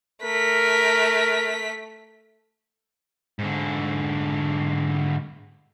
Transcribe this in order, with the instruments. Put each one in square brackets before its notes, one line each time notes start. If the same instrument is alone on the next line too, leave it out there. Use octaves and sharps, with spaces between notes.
[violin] A3 B6 [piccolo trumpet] A#4
[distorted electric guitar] G#2 D3